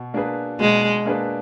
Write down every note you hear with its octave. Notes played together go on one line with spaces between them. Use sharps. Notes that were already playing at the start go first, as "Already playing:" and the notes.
Already playing: B2
A#3 D4 G#4 B4
B2 G#3
A#3 D4 G#4 B4